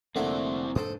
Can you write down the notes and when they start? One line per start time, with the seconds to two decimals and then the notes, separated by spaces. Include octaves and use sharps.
0.16 F1 D3 A3 A#3 C4 E4 G#5
0.75 G#2 C#4 D4 A4 C5 D#6